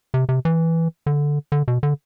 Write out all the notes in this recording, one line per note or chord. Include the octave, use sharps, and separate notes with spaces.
C3
C3
E3
D3
D3
B2
D3